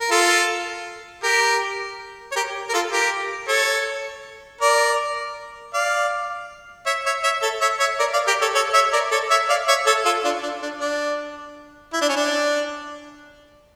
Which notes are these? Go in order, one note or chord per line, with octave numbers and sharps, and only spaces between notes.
A#4
F4 A4
G4 A#4
C#5
G4 A#4
A#4
F4 A4
G4 A#4
A4 C#5
A#4 D5
D5 F5
C#5 E5
C#5 E5
C#5 E5
A4 C#5
C#5 E5
C#5 E5
A#4 D5
D5 F5
G4 A#4
A4 C#5
A4 C#5
C#5 E5
A#4 D5
A4 C#5
C#5 E5
D5 F5
C#5 E5
A4 C#5
F4 A4
D4 F4
D4
D4
D4
E4
D4
C#4
D4